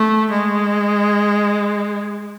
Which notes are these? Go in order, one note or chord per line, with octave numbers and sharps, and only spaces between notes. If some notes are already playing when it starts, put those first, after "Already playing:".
Already playing: A3
G#3